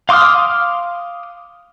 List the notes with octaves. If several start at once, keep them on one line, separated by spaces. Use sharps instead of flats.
F5 C6 D6 D#6 F6